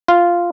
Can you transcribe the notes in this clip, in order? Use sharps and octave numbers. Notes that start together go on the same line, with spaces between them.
F4